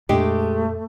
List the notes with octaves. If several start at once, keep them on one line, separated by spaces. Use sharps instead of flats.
F2 A#2 G#3 A3 D4 G4